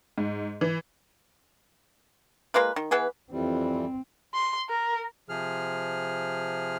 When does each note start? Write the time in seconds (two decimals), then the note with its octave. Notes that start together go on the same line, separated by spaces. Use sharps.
0.18 G#2
0.61 E3
2.54 G#3 A#3 F4 B4
2.76 D#3
2.91 E3 B3 G#4 B4
3.32 F2 E3 G3 C4
4.34 C6
4.69 A#4
5.29 C3 F3 G#4 F6